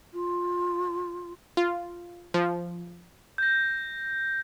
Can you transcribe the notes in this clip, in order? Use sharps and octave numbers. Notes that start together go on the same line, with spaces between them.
F4
F4
F3
G6 A#6